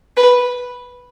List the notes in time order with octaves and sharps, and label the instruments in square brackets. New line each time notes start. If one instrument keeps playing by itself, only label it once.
[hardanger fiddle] B4